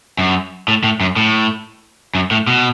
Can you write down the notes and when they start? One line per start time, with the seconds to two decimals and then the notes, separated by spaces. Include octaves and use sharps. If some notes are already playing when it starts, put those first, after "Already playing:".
0.19 F#2
0.68 A2
0.84 A2
1.01 F#2
1.16 A2
2.15 F#2
2.31 A2
2.47 B2